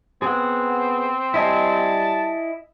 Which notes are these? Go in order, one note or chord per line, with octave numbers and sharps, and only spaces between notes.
B3 C4 G#4 F#5
G3 E4 D#5 G#5 A5